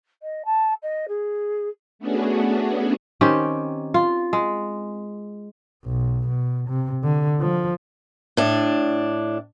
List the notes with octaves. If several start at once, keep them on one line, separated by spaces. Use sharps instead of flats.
D#5
A5
D#5
G#4
A3 B3 C#4 D4 F#4 G#4
D#3 C4 C#4 G4
F4
G#3
B1
B2
C3
D3
F3
A2 D4